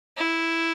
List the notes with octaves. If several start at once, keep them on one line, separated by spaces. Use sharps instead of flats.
E4